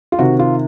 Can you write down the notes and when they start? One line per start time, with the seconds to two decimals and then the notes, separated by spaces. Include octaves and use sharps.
0.12 F4
0.19 C3 D#3 F#4
0.39 F4